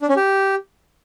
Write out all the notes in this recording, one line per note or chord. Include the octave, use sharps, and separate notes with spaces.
D4
C#4
G4